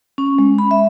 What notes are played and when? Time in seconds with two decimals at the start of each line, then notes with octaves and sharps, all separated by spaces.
0.18 C#4
0.39 G#3
0.58 B5
0.71 E5